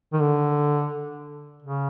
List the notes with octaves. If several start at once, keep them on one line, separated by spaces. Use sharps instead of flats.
D#3
D3
C#3